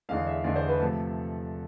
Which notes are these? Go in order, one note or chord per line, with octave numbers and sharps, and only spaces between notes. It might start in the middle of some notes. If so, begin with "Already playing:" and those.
E2 D3 G#3 F5
E5
E2 D3 G#3 D5
C5
B4
C3 F3 A3 A4